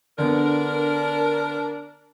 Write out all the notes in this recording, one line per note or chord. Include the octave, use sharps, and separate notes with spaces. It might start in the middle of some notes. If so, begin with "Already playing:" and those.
D3 B3 D4 A#4